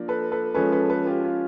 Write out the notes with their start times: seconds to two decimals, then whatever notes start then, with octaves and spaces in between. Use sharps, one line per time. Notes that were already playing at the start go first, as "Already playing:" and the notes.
Already playing: F3 A#3 D4
0.08 A4 B4
0.31 A4 B4
0.55 F3 G#3 C#4 A4 B4
0.72 A4 B4
0.89 A4 B4
1.07 F4 G4
1.24 F4